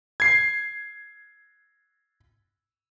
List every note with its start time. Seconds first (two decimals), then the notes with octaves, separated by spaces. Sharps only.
0.20 G#6 C7